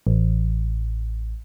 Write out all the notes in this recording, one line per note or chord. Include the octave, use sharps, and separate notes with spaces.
A1